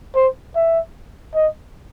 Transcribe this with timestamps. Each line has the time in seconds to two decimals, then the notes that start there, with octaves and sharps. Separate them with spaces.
0.15 C5
0.55 E5
1.35 D#5